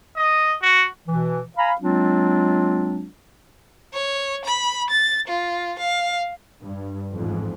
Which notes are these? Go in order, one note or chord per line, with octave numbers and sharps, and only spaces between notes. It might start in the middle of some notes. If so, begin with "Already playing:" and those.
D#5
F#4
B2 E3
F5 G#5 A#5 B5
F#3 G#3 C4 D4 F4
C#5
B5
A6
F4
F5
G2
A1 F2 G#2